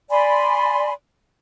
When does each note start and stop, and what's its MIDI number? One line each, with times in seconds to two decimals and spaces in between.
0.10 0.92 74
0.10 0.92 80
0.10 0.92 83
0.10 0.92 84